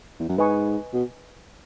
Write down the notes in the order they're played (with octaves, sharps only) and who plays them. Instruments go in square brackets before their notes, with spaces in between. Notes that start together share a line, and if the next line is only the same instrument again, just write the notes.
[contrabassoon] E2
F#2
[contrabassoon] G#2 [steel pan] B4 D#5 G#5 C#6
[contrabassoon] B2